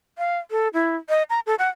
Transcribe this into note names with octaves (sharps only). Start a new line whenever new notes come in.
F5
A4
E4
D#5
A#5
A4
F#5